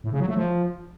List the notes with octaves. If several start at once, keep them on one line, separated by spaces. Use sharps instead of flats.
A2
C#3
F#3
A3
F3